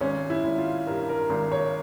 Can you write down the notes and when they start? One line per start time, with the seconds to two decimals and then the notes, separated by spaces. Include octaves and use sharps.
0.01 G#1 C#4
0.30 E4
0.44 G#1
0.58 F4
0.87 G2 A#4
1.09 A#4
1.30 G#1
1.52 C#5